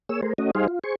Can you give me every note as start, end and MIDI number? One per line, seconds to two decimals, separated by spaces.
0.09 0.21 58
0.09 0.21 68
0.09 0.21 73
0.09 0.21 88
0.22 0.33 57
0.22 0.33 68
0.22 0.33 70
0.22 0.33 72
0.38 0.51 57
0.38 0.51 61
0.38 0.51 66
0.38 0.51 75
0.55 0.67 55
0.55 0.67 63
0.55 0.67 68
0.55 0.67 72
0.55 0.67 77
0.68 0.79 65
0.84 0.95 68
0.84 0.95 72
0.84 0.95 85